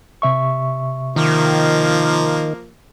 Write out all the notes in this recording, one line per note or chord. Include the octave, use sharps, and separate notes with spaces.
C3 E5 C#6
D#3 F3 A#3